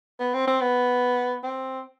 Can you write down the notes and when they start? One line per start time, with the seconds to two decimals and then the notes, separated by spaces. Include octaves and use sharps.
0.20 B3
0.34 C4
0.47 C4
0.61 B3
1.44 C4